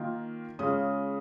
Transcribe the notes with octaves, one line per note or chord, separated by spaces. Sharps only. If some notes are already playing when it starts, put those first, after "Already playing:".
Already playing: D#3 A#3 F4
C#3 G#3 C#4 F4 D#6